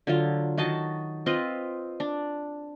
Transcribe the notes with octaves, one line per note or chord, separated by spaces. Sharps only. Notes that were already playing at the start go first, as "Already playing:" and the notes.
D3 F#3 F4
D#3 F#4 D#5 A5
C4 F4 B4 D#5
D4